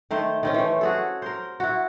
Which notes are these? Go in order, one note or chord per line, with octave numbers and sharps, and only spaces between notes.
D#3 A3 C5
D#3 C4 C#4
E3 A3
F#4 G#4 A4
A#4 C5
E4 F#4